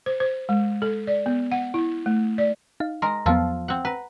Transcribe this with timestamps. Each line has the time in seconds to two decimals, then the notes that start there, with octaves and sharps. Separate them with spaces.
0.06 C5
0.20 C5
0.49 G#3
0.82 A4
1.07 D5
1.26 B3
1.52 F#5
1.74 E4
2.06 A3
2.38 D5
2.80 D#4 F5
3.02 G#3 A#4 C6 A#6
3.26 E2 F3 F#3 B3 F4 A4
3.68 C4 F#5
3.85 B4 F#5 A#5